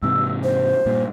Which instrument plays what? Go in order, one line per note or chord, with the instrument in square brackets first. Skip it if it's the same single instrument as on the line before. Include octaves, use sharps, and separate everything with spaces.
[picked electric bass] G#2 C3 E3 [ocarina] E6
[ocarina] C5
[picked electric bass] G2 A#2